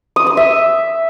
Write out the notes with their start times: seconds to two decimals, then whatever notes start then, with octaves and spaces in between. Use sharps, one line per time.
0.16 D#6
0.27 D#6
0.37 E5